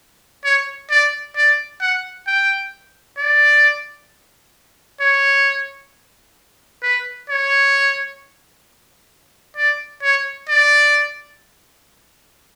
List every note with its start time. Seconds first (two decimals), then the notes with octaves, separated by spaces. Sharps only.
0.44 C#5
0.90 D5
1.36 D5
1.81 F#5
2.27 G5
3.18 D5
5.01 C#5
6.83 B4
7.30 C#5
9.57 D5
10.03 C#5
10.48 D5